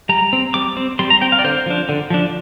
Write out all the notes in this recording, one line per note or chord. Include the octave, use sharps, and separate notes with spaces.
G3 A#5
C4
G3 D6
C4
G3 C6
A#5
C4 G5
F5
D5
D3 C5
F3 D4
D3
F3 D4